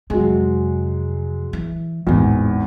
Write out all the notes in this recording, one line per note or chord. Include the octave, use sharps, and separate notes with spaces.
F2 C3 F#3 G#3
E3
G#1 E2 A2 D3